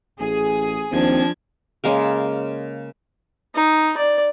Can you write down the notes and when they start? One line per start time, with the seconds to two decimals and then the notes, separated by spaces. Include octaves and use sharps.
0.20 A1 G#4
0.92 D#2 F3 C4 D4 G#6
1.84 C#3 G#3 A#3 A#4
3.55 D#4
3.97 D5